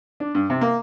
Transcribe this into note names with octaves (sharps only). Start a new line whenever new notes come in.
D4
G2
C3
A#3